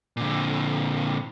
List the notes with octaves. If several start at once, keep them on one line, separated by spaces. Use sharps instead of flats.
A#2 D3